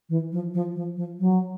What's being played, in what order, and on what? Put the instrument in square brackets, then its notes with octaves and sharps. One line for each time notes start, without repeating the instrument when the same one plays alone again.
[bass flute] E3
F3
F3
F3
F3
F#3